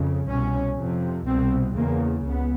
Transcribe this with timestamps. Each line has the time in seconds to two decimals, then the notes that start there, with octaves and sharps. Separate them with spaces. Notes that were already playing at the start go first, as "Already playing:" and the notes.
Already playing: F2 C#3
0.28 C2 B2 C#4
0.78 F2 C3
1.27 C2 B2 C4
1.76 E2 C#3 A#3
2.25 C#2 B3